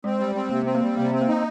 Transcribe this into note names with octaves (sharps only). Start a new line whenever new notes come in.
G#3 C4
G3
C4
C3 A#3
C4
A#3
G3
C3 A#3
C4
A#3
D#4